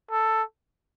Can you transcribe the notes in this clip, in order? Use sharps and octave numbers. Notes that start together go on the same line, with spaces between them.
A4